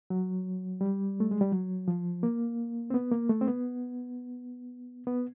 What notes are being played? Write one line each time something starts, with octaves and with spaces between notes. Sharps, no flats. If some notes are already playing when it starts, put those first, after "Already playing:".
F#3
G3
A3
G#3
G3
F#3
F3
A#3
C4
B3
A#3
A3
C4
B3
B3